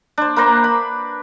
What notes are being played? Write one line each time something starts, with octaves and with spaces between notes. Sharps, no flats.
D4 C5
A#3 B4 C5 A#5
B5